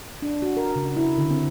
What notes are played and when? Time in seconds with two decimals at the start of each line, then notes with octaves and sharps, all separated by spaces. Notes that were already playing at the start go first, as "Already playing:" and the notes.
0.22 D4
0.42 F#4
0.57 A#4
0.76 C#3
0.96 E4
1.18 D3
1.30 C4